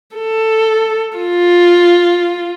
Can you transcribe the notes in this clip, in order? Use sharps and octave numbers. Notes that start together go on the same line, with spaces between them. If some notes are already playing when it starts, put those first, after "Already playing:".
A4
F4